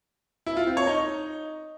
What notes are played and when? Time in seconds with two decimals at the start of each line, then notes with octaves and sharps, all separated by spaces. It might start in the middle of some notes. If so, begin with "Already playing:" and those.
0.46 E4
0.57 F4
0.67 C4
0.77 C#5
0.87 D#4